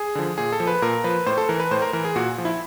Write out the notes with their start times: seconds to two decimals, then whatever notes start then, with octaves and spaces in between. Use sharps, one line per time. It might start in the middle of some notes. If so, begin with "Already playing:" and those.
Already playing: G#4
0.15 D3 F3
0.38 A#2 G#4
0.52 A4
0.60 F3
0.67 B4
0.82 A#2 A#4
1.04 F3 B4
1.26 A2 C5
1.38 A4
1.49 E3 A#4
1.60 B4
1.71 A2 C5
1.82 A#4
1.93 E3 A#4
2.05 G#4
2.16 A#2 F#4
2.38 F3
2.45 E4